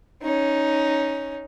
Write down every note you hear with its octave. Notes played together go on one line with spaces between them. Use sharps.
C#4 D#4